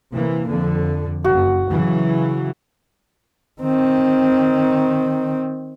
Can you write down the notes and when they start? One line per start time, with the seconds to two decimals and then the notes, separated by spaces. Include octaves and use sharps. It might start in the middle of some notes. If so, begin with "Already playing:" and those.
0.13 C3 E3 A#3
0.46 F2 D3
1.24 F#1 F#4
1.70 C#3 E3 F#3
3.61 D#3 C4